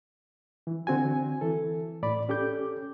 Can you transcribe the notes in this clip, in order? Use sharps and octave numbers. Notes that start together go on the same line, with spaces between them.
E3
D3 C4 F#4 G#5
E3 A4
A2 D5 B5
C#4 G4 A4 D6 G6